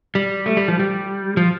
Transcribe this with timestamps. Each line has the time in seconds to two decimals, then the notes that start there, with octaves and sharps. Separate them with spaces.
0.15 G3
0.46 A3
0.57 G3
0.68 F3
0.79 G3
1.37 F3